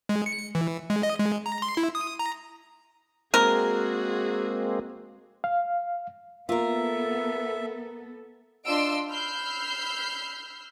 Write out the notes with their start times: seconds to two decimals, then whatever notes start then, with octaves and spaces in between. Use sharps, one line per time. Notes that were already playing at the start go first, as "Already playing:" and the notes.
0.09 G#3
0.26 C#7
0.55 E3
0.90 G#3
1.03 D#5
1.19 G#3
1.46 A#5
1.62 C6
1.77 E4
1.95 D#6
2.19 A#5
3.34 G#3 A#3 C4 F#4 G#4 A#4
5.44 F5
6.49 A#3 B3 F4 A4 A#4 E5
8.66 D4 F4 D#5 C6 E6 D7
9.09 B5 E6 F6 G6 C7